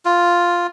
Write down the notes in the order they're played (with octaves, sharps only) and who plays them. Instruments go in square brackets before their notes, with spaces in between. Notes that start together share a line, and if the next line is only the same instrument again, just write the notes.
[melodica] F4